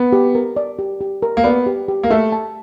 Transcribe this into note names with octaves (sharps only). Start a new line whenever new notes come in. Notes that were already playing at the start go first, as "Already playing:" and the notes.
Already playing: B3
G4
A#4
D5
G4
G4
A#4
A#3
B3 D5
G4
G4
A#3
A3 E5
A5